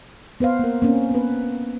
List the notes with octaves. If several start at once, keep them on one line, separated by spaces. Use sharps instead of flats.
B3 B4 C5 F5
A#3 A#4
A#3 C4 C#4
B3 B4